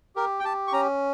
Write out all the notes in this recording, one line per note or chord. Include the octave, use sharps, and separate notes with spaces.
G4 A#4
G5
G4 A5
C#6
C#4 A#5